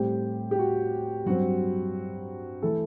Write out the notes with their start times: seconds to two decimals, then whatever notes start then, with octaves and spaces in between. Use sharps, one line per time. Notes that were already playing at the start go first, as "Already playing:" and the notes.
Already playing: A2 G3 C4 G4
0.51 G4
0.59 F#4
1.26 G2 F#3 C4 F#4
2.62 E3 A3 A4